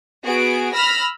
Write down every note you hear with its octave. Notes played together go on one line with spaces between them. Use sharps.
B3 F#4 G#4 D7
B5 E6 F6 A#6